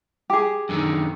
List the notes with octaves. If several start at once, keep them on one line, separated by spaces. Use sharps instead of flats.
G4 G#4
F#2 D3 D#3